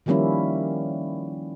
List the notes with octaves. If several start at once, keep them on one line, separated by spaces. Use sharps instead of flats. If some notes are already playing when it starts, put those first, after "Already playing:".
D#3 F3 G3 A#3 C#4 E4